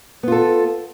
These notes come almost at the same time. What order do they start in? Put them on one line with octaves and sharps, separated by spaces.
B3 F4 A4